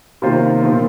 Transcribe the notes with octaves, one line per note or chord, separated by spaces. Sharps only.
C3 D#3 A#3 F4 C5
A#2 F3 C4